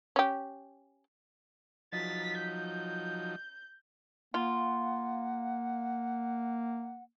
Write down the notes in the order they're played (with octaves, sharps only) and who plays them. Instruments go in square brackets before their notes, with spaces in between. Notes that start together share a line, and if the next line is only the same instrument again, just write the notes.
[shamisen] C#4 G4
[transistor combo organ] F3 F#3 D#4 [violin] A6 B6
[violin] G6
[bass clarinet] A#3 [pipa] F4 [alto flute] F#5